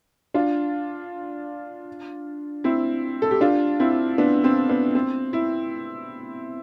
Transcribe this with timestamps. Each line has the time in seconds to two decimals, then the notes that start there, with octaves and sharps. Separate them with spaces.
0.34 D4 F4
2.64 C4 E4
3.22 A4
3.31 G4
3.41 D4 F4
3.80 C4 E4
4.18 B3 D4
4.44 C4
4.69 B3 D4
4.95 C4
5.33 E4